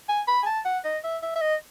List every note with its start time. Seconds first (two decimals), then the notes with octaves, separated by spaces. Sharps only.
0.09 G#5
0.27 B5
0.43 G#5
0.46 A5
0.65 F#5
0.85 D#5
1.04 E5
1.23 E5
1.35 E5
1.41 D#5